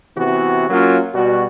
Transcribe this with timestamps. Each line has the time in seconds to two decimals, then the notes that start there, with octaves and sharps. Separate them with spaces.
0.16 C3 E3 B3 F#4
0.70 F#3 A#3 C#4 F4
1.14 B2 G3 F#4